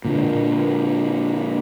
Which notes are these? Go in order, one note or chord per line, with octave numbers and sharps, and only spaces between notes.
A#2 D3 G#3